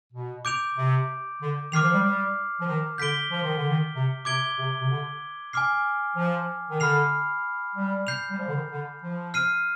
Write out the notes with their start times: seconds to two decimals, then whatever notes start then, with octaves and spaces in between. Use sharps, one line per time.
0.13 B2
0.45 D6 G6 D7 F7
0.76 C3
1.40 D3
1.72 D#3 D6 F6 C7 F7
1.82 F3
1.93 G3
2.04 G3
2.59 F3
2.67 D#3
2.98 D3 G6 B6 D7 G7
3.30 F3
3.43 D#3
3.56 D3
3.69 D#3
3.94 C3
4.25 C3 D6 G#6 D7 G7
4.58 C3
4.80 C3
4.89 D3
5.53 G#5 D6 F6 C7
6.16 F3
6.69 D#3
6.80 D3 B5 F6 C7 F7
7.75 G3
8.07 G6 C7 F7
8.31 G3
8.38 F3
8.47 D3
8.54 D#3
8.70 D3
9.02 F3
9.34 F6 C7 D#7